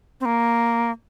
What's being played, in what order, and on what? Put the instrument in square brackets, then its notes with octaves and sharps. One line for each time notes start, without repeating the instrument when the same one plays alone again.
[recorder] C4
A#3